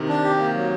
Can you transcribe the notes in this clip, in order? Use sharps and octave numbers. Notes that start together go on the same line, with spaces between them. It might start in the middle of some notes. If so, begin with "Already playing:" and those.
Already playing: C3 D#3
D4
G4
A#3
F#3